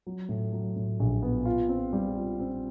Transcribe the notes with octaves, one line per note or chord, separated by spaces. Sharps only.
F#3
A2
F#3
A2
A#1
B3
F4
C4
G3
F4
C4